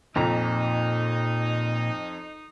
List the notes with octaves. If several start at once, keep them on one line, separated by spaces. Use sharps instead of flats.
F2 A#2 D#4 A#5